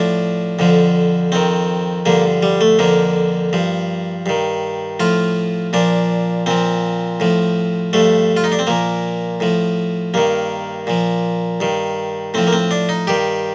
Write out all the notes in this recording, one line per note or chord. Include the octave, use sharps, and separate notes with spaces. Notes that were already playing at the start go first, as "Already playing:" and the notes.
Already playing: A2 F3 D4
F2 D3 F3
F2 D#3 C4
G2 D3 F3 A#3
G3
A3
F2 D3 F3 A#3
G2 F3
G2 D#3
A2 F3 F4
A#2 F3 D4
A#2 F3 C4
A2 F3
G2 F3 A3
F4
D#4
D4
C4
A#2 F3 A#3
A2 F3
G2 D#3 A#3
A#2 F3
G2 D#3
A2 F3 C4
A#3
C4
D4
D#4
G2 D#3 G4